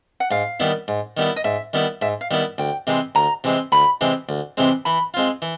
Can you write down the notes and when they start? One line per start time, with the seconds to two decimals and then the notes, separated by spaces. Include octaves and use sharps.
0.20 F#5
0.31 G#2 F5
0.60 D#3 G3 B3 E4
0.88 G#2
1.17 D#3 G3 B3 E4
1.36 D#5
1.44 G#2 E5
1.73 D#3 G3 B3 E4
2.02 G#2 E5
2.21 F5
2.31 D#3 G3 B3 E4
2.58 D2 G5
2.87 C3 E3 G#3 C4
3.15 D2 A#5
3.44 C3 E3 G#3 C4
3.72 D2 B5
4.01 C3 E3 G#3 C4
4.29 D2
4.57 C3 E3 G#3 C4
4.85 E3 B5
5.14 G#3 C4 F4
5.42 E3